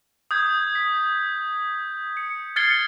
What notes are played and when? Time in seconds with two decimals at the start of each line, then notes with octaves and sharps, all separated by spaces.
0.31 D#6 G6 G#6
0.75 B6
2.17 C#7
2.56 F6 G#6 A6 C7 C#7 G7